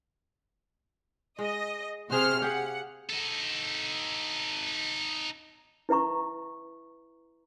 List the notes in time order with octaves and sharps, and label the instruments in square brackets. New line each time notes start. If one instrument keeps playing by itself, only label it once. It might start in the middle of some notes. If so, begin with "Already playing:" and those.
[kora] G#3 [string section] D#5
[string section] C3 C5 F6 [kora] F#4 G#4
[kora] G4 G#4 F5 [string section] F#5
[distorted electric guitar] D#4 A4
[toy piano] E4 B4 E5 A#5 C#6